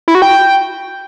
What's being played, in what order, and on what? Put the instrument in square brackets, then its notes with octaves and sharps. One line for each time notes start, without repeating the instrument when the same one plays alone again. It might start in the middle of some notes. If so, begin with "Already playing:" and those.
[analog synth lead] E4
F#4
G5